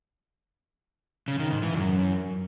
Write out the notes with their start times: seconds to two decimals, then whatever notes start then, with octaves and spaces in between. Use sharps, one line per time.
1.28 C#3
1.39 D#3
1.51 G#2
1.62 E3
1.74 F#2